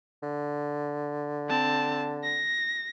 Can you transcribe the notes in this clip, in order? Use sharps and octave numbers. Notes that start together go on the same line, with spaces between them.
D3
C4 A5
A#6